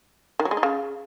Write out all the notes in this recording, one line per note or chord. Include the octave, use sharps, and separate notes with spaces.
D#3
F#3
G#3
D#4
C#3